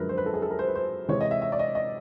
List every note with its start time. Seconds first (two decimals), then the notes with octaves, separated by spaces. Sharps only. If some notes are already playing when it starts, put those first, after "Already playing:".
Already playing: F#2 D3 F3 G#3 A#4 B4
0.09 C5
0.18 B4
0.26 A4
0.34 G#4
0.42 A4
0.51 A#4
0.59 C5
0.68 B4
0.75 C5
1.08 C3 E3 G#3 C#5
1.21 D#5
1.31 E5
1.42 E5
1.52 D5
1.59 D#5
1.75 D#5